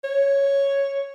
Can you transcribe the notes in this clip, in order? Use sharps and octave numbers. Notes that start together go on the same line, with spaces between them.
C#5